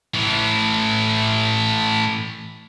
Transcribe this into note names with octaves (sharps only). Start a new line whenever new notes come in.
A2 E3